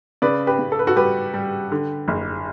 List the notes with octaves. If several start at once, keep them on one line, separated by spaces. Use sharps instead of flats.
C#3 B4 D5
G4 B4
C#3
A4
B4
F#4 A4
G3 G4 B4
G3
D3
F#1